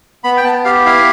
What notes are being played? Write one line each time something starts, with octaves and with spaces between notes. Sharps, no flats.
B3 B5
G5
B3 A5
G4 F5
E4 F5